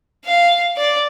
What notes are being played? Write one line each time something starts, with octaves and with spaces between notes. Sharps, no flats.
F5
D5